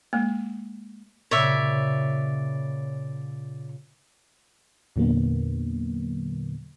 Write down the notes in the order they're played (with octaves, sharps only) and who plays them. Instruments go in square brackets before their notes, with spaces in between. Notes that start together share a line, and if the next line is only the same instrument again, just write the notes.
[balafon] G#3 A#3
[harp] A#2 C#3 [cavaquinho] C#5 D5 E5
[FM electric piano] E2 A#2 D3 F#3 A#3 B3